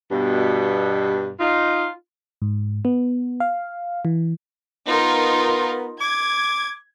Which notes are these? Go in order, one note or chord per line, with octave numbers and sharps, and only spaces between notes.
G2 B2
D#4 F4
G#2
B3
F5
E3
B3 D#4 F4 A#4
D6 G#6